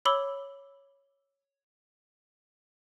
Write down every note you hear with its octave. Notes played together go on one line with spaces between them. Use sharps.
C#5 B5 D6 E6 F#7 G7